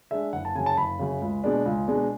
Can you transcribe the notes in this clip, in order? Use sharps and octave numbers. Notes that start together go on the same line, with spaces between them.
G#3 D4 E5
F#1 F#5
A5
F#2 C#3 G#5
A5
F#1 B5
F#2 C#3
C#2
B2 G#3 D4
C#2
B2 G#3 D4